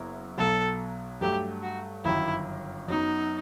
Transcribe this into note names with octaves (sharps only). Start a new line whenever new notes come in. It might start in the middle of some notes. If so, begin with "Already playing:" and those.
Already playing: F#1 F#2 F#3 B3 E4
B1 B2 F#3 A4
G2 F#3 A3 G4
F#4
G1 F#2 D#3 F#3 E4
F#2 F#3 B3 D#4